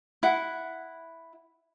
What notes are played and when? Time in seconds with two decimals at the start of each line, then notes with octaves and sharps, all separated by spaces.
0.23 E4 F#5